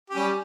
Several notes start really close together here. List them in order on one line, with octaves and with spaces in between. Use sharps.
G4 C#4 G3